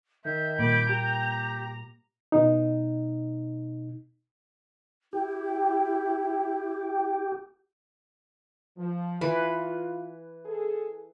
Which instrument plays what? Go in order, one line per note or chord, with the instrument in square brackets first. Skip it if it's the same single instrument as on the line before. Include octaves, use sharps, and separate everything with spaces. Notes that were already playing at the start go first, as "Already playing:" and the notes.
[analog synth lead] D#3 [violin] E5 [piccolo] G6
[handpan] A#2 G3 A#3 [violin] B5 D6
[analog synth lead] G4 [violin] A#5
[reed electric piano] B2 D#4
[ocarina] E4 [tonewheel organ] G4
[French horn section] F3
[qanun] E3 B4 [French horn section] F4
[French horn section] G#4 A4